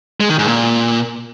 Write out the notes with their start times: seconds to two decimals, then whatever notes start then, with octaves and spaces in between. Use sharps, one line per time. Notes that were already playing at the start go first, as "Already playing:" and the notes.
0.20 G#3
0.29 D#3
0.39 G#2
0.48 A#2